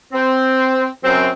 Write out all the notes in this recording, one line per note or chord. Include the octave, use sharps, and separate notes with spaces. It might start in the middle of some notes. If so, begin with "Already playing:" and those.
C4
F#2 C4